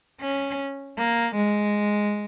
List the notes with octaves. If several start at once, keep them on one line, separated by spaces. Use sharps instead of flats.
C#4
A#3
G#3